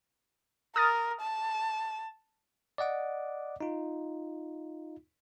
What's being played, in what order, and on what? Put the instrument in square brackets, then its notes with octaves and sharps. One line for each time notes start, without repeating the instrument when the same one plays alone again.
[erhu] A#4 [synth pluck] D#6 F6 A6
[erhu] A5
[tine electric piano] D5 D#5 F#5 D6
D#4 F4